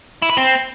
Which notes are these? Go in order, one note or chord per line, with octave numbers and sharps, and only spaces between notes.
E4
B4
C4